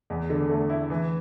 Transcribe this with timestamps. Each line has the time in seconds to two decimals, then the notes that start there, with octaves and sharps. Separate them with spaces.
0.10 E2
0.30 D3
0.50 A3
0.70 E4
0.90 E3